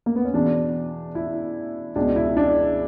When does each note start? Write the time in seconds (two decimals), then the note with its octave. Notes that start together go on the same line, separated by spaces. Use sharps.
0.06 A#3
0.16 B3
0.25 C#4
0.33 E2 B2 D4
1.15 E4
1.96 C#2 B2 D4
2.16 E4
2.37 D4